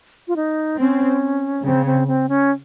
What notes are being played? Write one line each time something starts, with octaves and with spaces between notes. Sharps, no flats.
F4
D#4
C4 C#4
C#3 C4
C4
C4
C#4